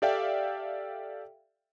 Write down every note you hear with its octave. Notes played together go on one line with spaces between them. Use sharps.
G4 A4 D5 E5 F5 G5